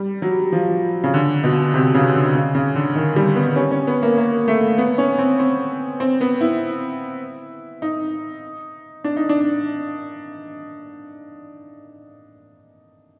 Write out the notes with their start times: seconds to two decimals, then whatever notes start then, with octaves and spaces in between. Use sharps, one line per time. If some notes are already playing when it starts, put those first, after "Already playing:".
Already playing: G3
0.22 F#3
0.52 F3
1.04 C#3
1.14 D3
1.44 B2
1.74 C3
1.94 C#3
2.15 D3
2.35 C#3
2.55 C#3
2.76 D3
2.95 D#3
3.16 G3
3.36 B3
3.56 C#4
3.71 C#4
3.87 B3
4.02 A#3
4.17 A#3
4.48 A3
4.78 B3
4.98 C#4
5.19 C4
5.39 C4
6.00 C4
6.21 B3
6.41 E4
7.82 D#4
9.04 D4
9.17 D#4
9.29 D4